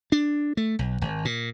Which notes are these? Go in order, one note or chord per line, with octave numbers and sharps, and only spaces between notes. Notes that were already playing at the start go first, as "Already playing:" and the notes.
D4
A3
B1
G#1
A#2